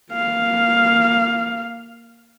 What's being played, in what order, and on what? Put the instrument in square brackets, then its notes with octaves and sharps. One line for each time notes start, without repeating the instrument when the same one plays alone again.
[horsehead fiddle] A#3 F5